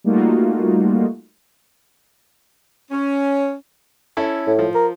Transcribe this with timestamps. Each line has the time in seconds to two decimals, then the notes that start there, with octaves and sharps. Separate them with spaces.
0.04 G3 A3 A#3 D#4 F4 F#4
2.91 C#4
4.17 C#4 E4 A4
4.47 A2
4.59 F3
4.75 A#4